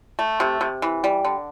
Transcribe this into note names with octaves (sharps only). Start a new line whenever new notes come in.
A3
C3
C3
E3
G3
D3